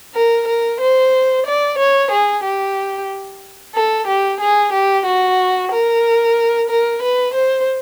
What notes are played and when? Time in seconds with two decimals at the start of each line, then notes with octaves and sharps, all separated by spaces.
0.15 A#4
0.48 A#4
0.80 C5
1.46 D5
1.79 C#5
2.11 G#4
2.44 G4
3.75 A4
4.07 G4
4.40 G#4
4.73 G4
5.06 F#4
5.72 A#4
6.70 A#4
7.02 B4
7.34 C5